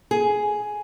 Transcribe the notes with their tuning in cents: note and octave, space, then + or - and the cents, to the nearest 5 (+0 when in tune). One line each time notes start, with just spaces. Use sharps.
G#4 +10